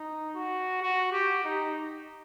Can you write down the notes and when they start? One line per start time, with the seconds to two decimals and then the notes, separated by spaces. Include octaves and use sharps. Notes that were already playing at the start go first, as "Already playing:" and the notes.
Already playing: D#4
0.35 F#4
0.81 F#4
1.12 G4
1.44 D#4